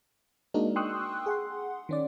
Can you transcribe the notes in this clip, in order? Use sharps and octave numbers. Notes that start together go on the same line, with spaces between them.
G#3 A#3 D4 D#4 F#4 A#4
G5 C6 C#6 D#6 E6 F#6
G#4 F#5 C6
D#3 C#4 D5